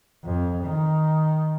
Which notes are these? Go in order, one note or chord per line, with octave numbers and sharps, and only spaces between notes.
F2
D#3